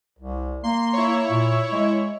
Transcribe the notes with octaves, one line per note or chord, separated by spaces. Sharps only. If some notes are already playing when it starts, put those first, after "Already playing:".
C2
A#3 C6
E4 C#5
A#2
G#3